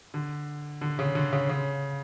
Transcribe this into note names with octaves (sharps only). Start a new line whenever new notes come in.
D3
D3
C#3
D3
C#3
C#3